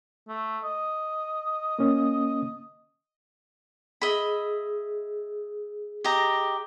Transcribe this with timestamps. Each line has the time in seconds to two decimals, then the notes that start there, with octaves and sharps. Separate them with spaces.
0.28 A3
0.64 D#5
1.79 A#3 C#4
4.02 G#4 D#5 E5 B5
6.04 G4 D#5 A#5